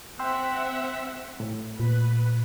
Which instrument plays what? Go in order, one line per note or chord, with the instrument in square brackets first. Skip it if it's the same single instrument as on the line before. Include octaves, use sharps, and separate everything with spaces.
[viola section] C4 E5 F#5 [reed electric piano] G5 C6 E6
[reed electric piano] A2
[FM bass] A#2 [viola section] B4